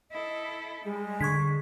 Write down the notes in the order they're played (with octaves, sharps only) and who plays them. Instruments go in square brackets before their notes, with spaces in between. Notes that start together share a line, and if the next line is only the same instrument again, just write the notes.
[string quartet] E4 A4 [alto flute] D#5
[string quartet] G3 [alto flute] G#3
[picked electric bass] D3 [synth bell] C#6 G#6 B6